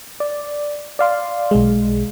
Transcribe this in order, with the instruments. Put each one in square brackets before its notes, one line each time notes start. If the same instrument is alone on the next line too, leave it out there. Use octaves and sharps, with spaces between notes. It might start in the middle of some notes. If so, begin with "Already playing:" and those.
[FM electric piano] D5
D5 F5 C6
B1 G#3